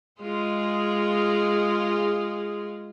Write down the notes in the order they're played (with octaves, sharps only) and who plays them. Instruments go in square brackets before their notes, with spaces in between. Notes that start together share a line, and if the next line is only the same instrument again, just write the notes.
[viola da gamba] G#3 F4 G#4